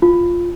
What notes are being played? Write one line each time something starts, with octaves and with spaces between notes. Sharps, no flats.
F4